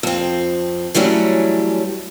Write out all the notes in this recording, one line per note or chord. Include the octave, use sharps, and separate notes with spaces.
F2 C4
E3 F#3 G3 A3 C#4